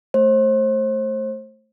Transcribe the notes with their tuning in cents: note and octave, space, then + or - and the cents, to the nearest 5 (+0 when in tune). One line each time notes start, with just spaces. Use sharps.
A3 +0 C5 +35